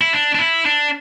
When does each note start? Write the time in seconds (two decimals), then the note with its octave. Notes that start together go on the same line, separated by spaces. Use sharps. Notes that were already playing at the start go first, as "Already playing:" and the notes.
0.01 E4
0.13 D4
0.35 D4
0.39 E4
0.65 D4